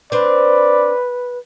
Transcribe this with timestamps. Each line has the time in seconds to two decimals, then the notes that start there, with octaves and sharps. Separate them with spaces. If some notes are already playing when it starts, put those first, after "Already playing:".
0.12 C4 D4 B4 D5